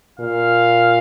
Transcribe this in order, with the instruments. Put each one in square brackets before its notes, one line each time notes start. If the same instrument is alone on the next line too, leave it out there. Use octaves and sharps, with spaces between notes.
[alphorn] A#2 [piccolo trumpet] F5